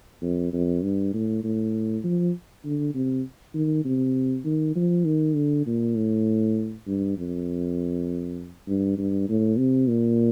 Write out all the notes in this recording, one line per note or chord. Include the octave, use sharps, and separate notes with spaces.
F2
F2
G2
A2
A2
F3
D3
C3
D#3
C3
D#3
F3
D#3
D3
A#2
A2
G2
F2
G2
G2
A2
C3
A#2